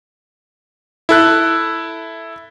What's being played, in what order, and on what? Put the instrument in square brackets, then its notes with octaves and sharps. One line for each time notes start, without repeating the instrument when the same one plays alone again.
[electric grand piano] E4 A4 F#6